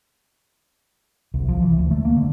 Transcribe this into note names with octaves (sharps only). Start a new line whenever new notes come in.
C2
F3
E3
D2
A3
A#3
D3